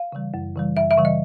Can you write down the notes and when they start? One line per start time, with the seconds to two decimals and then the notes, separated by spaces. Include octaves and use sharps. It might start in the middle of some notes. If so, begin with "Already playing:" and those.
Already playing: F5
0.12 C#3 E3 G3
0.34 F#2
0.56 C#3 E3 G3
0.77 F#2 E5
0.91 E5
0.97 C#3 E3 G3
1.05 D#5